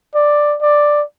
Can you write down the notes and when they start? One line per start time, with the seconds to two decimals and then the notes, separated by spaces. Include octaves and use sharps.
0.15 D5
0.61 D5